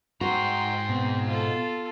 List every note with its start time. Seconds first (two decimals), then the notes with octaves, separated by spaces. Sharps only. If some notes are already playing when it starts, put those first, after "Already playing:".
0.21 G#2 F#4 G5 A#5 C6
0.89 B2 C4
1.27 F4 A4